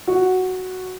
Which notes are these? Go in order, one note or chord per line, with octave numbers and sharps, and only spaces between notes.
F#4